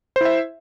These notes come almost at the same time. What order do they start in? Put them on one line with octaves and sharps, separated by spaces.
C5 E4 E5